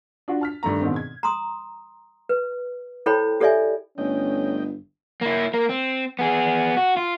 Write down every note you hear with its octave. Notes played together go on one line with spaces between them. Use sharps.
D4 F4 F#4
A5 F6 B6
G2 D#3 A3 A#5
G#2 B2 D#3 C4
G#6
A#5 C6 D#6
B4
E4 A4 C5 C#5 G5 B5
G4 A4 C#5 D5 E5 G#5
G1 A3 C#4 D#5 G5
A#3 E4
A#3 A#4
C4
B3 G#4
F#4
F4